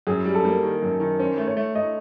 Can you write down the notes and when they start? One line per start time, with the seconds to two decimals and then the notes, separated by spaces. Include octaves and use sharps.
0.07 F#2 G#4
0.25 G3
0.35 A4
0.45 A#3
0.63 D#3
0.82 F#2
1.00 D#3
1.19 C#4 C5
1.38 A3
1.47 C#5
1.57 A3
1.75 A3 D#5